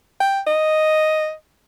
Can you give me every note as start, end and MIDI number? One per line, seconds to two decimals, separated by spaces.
0.20 0.40 79
0.47 1.33 75